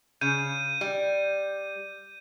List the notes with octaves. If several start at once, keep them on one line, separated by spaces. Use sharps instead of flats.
C#3 G6 D#7
G3